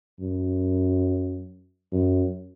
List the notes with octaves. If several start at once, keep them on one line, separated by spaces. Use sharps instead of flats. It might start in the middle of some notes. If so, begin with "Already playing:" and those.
F#2
F#2